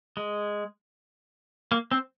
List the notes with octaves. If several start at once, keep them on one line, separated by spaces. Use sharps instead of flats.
G#3
A#3
C4